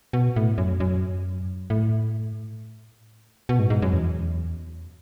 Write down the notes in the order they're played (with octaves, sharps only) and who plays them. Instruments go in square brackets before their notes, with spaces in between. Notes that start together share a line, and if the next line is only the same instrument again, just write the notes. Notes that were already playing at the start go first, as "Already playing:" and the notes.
[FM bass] B2
A2
F#2
F#2
A2
B2
G#2
G#2
F#2
E2